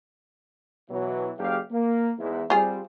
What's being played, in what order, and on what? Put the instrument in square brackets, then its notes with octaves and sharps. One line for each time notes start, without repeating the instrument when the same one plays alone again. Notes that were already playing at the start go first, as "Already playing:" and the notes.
[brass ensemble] B2 E3 F#3
F#1 G4 F5
A#3
E2 G#2 E4
[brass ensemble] G3 C4 [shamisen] F4 G#4